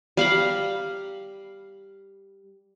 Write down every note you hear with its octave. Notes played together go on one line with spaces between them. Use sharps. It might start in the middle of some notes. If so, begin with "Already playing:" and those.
G3 F5 A#5 B5